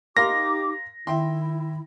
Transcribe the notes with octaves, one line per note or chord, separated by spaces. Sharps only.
D#4 G4 A#4 F5 C6 D6 A#6
D#3 E4 E5 G5 C6